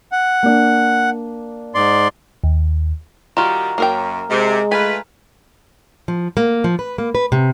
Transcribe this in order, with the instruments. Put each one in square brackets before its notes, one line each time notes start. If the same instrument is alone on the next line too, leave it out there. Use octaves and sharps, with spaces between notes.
[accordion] F#5
[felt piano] A#3 D4
[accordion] G#2 D5 C6
[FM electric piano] D#2
[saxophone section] D#3 G3 [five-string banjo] F4 F#4 [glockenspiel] A#5
[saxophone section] F#2 [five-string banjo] A#3 A#4 G5
[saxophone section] C3 [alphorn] G#3
[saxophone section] A3 F4 B4 [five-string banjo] G#5
[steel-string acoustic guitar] F3
A#3
F3
B4
A#3
B4
C3